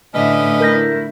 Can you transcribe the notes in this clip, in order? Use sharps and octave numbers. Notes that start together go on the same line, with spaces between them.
A2 D3 C#4 B4 D#5 E5
A3 E4 A#4 G6 A#6